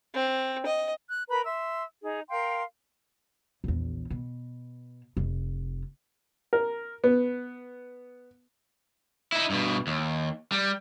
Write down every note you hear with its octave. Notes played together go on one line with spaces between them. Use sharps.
C4
D#5
F#6
A#4 B4 A#5 B5
E5 C6 E6
D#4 G#4
A#4 F5 G5 C6
A#1 E2
B2
F1
A#4
B3
D#4 E4
G2 B2
D#2
G3